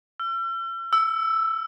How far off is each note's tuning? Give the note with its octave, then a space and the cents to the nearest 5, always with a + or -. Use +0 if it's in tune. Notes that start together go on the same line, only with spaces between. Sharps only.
E6 +45
E6 +0